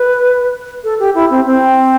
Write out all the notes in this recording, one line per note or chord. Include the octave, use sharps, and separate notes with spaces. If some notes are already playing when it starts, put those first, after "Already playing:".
Already playing: B4
A4
G4
E4
C4
C4